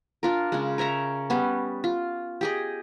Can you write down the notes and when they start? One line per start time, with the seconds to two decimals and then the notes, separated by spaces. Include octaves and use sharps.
0.23 D4 F4 A#4
0.52 C#3 G#3
0.78 A#4 C#5 E5 A#5
1.30 G3 B3 C#4
1.84 F4
2.41 G4 G#4 D#5